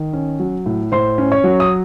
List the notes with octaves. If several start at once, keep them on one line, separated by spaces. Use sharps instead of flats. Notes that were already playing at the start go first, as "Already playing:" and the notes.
Already playing: D#3
C#4
F#3
A2
A2 C5 C6
C#4
C#5 C#6
F#3
D#6